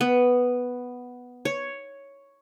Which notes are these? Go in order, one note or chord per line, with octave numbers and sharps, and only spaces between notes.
B3
C#5